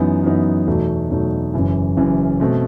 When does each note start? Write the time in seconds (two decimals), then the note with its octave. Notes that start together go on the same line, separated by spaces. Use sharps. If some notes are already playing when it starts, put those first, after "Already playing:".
Already playing: F#2 E3 B3 D#4
0.23 F#2 E3 B3 D#4
0.67 E2 B2 F#3 A3 D#4
1.10 E2 B2 F#3 A3 D#4
1.54 F#1 F#2 E3
1.97 F#1 F#2 E3
2.40 B2 A3 C4